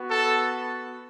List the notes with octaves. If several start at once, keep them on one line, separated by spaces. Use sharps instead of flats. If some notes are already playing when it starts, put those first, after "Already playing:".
Already playing: B3 F#4
A4